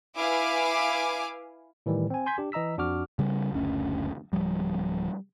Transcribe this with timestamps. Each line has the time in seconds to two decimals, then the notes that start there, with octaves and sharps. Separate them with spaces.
0.17 E4 B4 F5 G#5 D6
1.86 A2 D#3 E3 G3
2.10 C4 G#5
2.26 G#5 C6 G6 G#6 B6
2.38 D4 G4
2.52 E3 D#5 A#5 E6 B6
2.78 F2 D4 F#4 D6 F6
3.19 C#3 G3
3.53 F#1 D2 C#4
4.33 D1 F3 G3